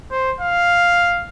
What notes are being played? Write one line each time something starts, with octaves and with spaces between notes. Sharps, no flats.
C5
F5